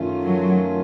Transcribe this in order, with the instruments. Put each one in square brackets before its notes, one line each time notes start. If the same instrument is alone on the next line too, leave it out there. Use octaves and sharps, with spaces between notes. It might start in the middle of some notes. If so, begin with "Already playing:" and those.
Already playing: [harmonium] F#2 D#3 A3 C#4 F4
[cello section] F#3